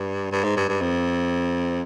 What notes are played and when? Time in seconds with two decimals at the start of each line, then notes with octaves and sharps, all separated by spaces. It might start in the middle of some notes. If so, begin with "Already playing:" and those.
Already playing: G2
0.32 G2
0.44 G#2
0.57 G2
0.68 G2
0.81 F2